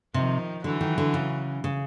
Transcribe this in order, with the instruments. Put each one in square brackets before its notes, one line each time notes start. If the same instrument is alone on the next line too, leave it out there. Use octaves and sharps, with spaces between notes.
[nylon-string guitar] C3 [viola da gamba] D#3 F3
[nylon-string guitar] D3 [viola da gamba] E3 F#3
[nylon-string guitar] D#3
D3
C#3
C#3